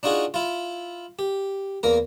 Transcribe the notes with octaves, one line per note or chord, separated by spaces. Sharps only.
D4 D#4 F4 F#4 G#4
E4 F4
G4
E2 A#3 A#4